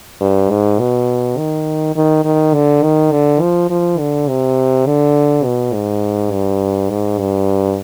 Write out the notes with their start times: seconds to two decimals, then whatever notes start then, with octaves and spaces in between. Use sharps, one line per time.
0.21 G2
0.50 G#2
0.79 B2
1.37 D#3
1.96 D#3
2.25 D#3
2.54 D3
2.83 D#3
3.12 D3
3.41 F3
3.70 F3
3.99 D3
4.28 C3
4.86 D3
5.44 B2
5.74 G#2
6.31 G2
6.90 G#2
7.19 G2